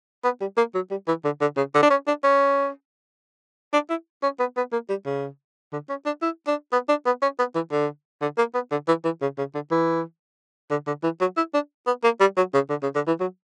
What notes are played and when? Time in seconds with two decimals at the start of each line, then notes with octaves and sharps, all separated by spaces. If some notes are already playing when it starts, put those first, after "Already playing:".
0.24 B3
0.41 G3
0.57 A#3
0.75 F#3
0.91 G3
1.08 E3
1.24 D3
1.41 D3
1.57 C#3
1.74 D3
1.83 D4
1.91 C#4
2.07 D4
2.24 C#4
3.73 D4
3.90 E4
4.23 C#4
4.39 B3
4.57 B3
4.72 A#3
4.89 G3
5.06 C#3
5.73 D3
5.89 C#4
6.06 D4
6.22 E4
6.47 D4
6.72 B3
6.89 D4
7.06 B3
7.22 C#4
7.39 B3
7.55 E3
7.71 D3
8.22 D3
8.38 A#3
8.54 B3
8.71 D3
8.88 E3
9.04 E3
9.22 C#3
9.38 C#3
9.54 D3
9.71 E3
10.71 D3
10.87 D3
11.03 E3
11.21 F#3
11.37 E4
11.54 D4
11.87 B3
12.04 A#3
12.20 G3
12.37 F#3
12.54 C#3
12.70 D3
12.83 C#3
12.95 D3
13.07 E3
13.20 F#3